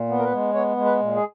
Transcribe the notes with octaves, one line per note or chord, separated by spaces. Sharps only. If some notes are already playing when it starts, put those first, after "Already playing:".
Already playing: A#2
B3
A#4
B4
G#3
B3 C#5
G#3
B4
A#2
G#4